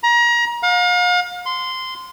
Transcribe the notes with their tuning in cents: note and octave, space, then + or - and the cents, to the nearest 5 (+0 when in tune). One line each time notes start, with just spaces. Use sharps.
A#5 +30
F5 +40
C6 -15